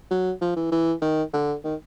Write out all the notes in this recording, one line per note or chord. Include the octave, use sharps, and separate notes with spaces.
F#3
F3
E3
E3
D#3
D3
D#3